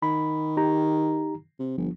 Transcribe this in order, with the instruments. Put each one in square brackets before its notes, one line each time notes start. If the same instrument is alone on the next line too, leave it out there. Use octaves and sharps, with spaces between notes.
[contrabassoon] D#3 [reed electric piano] B5
[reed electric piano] D#4 G4 A#5
[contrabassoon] C3
[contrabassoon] G1 [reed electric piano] F3